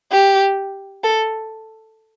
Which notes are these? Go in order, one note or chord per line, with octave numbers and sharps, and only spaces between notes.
G4
A4